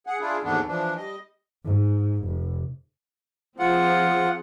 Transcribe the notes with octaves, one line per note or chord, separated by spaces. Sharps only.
G#4 F#5
D4 E4 F4 G#4
D#2 G#2 E3 A3 B3 D4
E3 F3 D4
G3 D#5
G#2
F1
F3 C4 F4 G#4 F#5